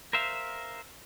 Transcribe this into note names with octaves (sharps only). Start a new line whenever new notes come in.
A#4 C5 E5 F5